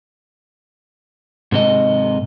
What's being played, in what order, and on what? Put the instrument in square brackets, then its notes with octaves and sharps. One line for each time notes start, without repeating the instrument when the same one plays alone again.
[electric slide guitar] G#2 C3 D#5